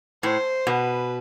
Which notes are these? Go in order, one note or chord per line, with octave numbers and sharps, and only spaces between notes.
A2 C5
B2 B4